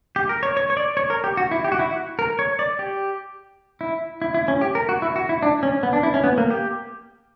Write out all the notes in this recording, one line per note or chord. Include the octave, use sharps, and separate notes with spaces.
G4
A#4
C#5
C#5
C#5
D5
C#5
A#4
G4
F#4
E4
G4
F#4
E4
F#4
A#4
C#5
D5
G4
E4
E4
E4
C#4
G4
A#4
F#4
E4
F#4
E4
D4
C#4
B3
D4
E4
C#4
B3
A#3
G4